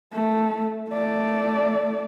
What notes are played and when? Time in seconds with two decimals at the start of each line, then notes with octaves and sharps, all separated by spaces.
0.13 A3
0.89 A3 D5